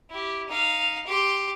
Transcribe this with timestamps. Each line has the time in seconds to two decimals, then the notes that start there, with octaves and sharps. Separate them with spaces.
0.10 E4 G4
0.48 D#4 F5
1.07 G4 C6